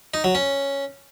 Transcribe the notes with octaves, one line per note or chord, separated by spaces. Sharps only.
D#4
F#3
C#4